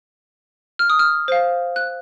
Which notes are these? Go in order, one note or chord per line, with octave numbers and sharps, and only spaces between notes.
F6
D#6
F6
C5 F5
F#6